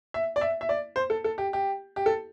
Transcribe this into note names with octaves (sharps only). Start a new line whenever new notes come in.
E5
D5
E5
E5
D5
C5
A4
A4
G4
G4
G4
A4